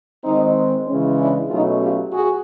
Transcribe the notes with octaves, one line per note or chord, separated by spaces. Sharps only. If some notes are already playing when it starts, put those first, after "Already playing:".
D#3 G#3 C4 D#4
C#3 E3 G#3 C#4
D4 E4
B2 F#3 A3 C#4 D#4 F4
F4 G4
F#4 G#4